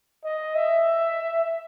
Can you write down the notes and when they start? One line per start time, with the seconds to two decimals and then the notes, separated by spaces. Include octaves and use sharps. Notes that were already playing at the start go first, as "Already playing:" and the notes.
0.24 D#5
0.55 E5